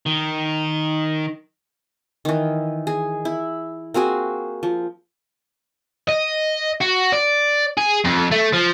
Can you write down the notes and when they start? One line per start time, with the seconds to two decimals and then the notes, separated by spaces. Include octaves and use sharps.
0.06 D#3
2.25 D#3 E3
2.87 G#4
3.25 E4
3.94 A#3 C4 F#4 G#4
4.63 F3
6.09 D#5
6.81 F#4
7.13 D5
7.78 G#4
8.05 F2
8.32 A3
8.54 F3